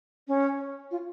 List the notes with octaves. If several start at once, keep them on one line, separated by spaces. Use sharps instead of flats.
C#4
F4